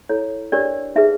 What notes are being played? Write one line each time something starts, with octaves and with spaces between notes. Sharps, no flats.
E4 A4 C#5
D4 G4 A#4 C#5 D5
D#4 G#4 B4 E5